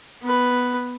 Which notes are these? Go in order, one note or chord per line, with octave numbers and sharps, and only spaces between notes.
B3 B4